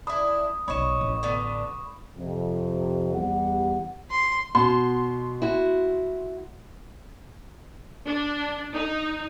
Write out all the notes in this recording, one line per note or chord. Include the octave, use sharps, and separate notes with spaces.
D4 E4 B5 D#6
B1 C#5 D#5 B5 C#6 E7
A1
D3 B3
F2 C3
E2 G3 G4 F#5
C6
B2 C6
E4 F#4
D4
D#4